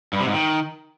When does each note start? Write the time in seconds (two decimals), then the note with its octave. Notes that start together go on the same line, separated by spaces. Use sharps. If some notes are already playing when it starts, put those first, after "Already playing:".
0.13 G2
0.20 C3
0.27 G#2
0.34 D#3